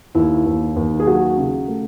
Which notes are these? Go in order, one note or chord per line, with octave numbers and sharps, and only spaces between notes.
D#2 E4
D#2
D#2
G#4
F#3 F#4
C#3
A3